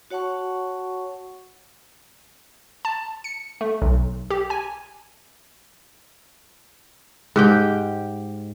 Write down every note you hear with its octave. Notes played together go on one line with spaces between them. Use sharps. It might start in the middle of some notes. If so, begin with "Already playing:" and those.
F#4 C#5 F#5 A5 C#6
A5
C#7
A3
B1
G4
G#5
G#2 G4 G5